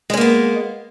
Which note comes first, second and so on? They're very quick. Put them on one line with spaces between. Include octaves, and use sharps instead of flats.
G#3 C#4 A#3 B3